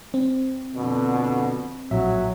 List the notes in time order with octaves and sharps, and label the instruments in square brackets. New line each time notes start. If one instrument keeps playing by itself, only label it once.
[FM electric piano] C4
[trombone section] F2 B2 D3
[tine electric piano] A#1 A2 E5 [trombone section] F#3